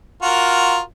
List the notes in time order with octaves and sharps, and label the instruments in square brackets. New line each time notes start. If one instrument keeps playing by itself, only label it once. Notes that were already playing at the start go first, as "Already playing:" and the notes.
[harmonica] F4 F#4 A#4